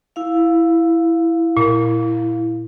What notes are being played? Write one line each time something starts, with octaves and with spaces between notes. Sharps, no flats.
E4 F5
A#2